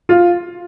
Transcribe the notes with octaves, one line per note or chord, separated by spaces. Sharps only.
F4